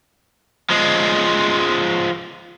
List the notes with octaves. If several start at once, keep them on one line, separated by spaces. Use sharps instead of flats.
F3 G#3